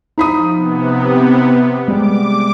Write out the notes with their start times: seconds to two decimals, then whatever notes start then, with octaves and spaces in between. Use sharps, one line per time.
0.18 F3 D#4 B5 D#6
0.54 C3 B3
1.88 G3 G#3 D6